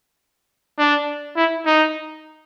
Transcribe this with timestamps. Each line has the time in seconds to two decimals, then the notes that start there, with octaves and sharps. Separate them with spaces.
0.79 D4
1.36 E4
1.66 D#4